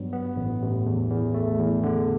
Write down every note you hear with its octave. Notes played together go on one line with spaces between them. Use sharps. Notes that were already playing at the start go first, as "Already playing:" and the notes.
Already playing: G2 F#3 B3
B3
A1
A1
E2
E2
A3
E2
D3